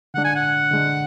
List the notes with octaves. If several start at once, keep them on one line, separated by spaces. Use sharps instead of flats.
D3 G#3 D4 F#5
G#5
F#5
D3 G#3 D4